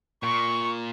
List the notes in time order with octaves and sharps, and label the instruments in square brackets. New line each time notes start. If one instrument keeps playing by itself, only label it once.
[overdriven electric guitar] A#2 [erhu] C#6